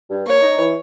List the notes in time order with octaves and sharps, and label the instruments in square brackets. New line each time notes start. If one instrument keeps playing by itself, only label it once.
[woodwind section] G2
[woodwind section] A#3 [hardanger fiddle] C#5
[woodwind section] D#4
E3